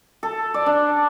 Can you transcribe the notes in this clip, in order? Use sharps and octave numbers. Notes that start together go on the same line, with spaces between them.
A4
D5
D4